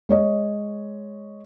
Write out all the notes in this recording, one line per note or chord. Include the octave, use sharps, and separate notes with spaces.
G#3 C#5 D#5